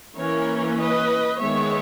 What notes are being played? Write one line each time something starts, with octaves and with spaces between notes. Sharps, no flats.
E3 A#3 C#4 A#4 C#5
B4 D#5
D#3 G#3 B3 C#5 E5